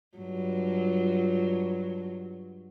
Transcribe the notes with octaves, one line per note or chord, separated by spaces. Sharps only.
G2 F#3 F4